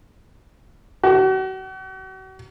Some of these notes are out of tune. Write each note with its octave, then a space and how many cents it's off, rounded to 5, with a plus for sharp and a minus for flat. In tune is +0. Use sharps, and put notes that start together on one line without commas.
F#4 +40